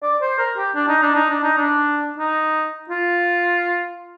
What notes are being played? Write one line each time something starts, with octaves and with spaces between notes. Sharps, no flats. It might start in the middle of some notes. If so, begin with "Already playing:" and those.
D5
C5
A#4
G4
D4
D#4
D4
D#4
D4
D#4
D4
D#4
F4